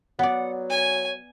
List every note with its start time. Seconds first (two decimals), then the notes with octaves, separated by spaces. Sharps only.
0.19 F#3 B3 D5 F#5
0.70 C#5 G#5